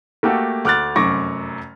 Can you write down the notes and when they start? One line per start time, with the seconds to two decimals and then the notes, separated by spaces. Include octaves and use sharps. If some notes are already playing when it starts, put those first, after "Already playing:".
0.23 A3 A#3 F#4 G4 A4
0.65 D2 D6 F6 F#6 A6
0.96 F1 F#2 C#6 D6 A#6